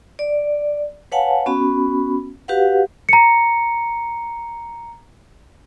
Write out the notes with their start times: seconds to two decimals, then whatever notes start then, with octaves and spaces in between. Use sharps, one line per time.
0.19 D5
1.12 B4 C#5 F5 F#5 G#5 A5
1.46 B3 C#4 F#4 B5
2.48 F#4 G4 B4 F5 F#5
3.09 A#5 C#7